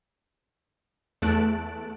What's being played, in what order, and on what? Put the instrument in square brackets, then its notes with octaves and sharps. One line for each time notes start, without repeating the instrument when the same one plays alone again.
[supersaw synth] E2 A3 A5 F#6 D7